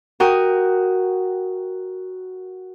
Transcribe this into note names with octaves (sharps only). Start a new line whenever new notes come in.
F#4 A#4 G5 D#6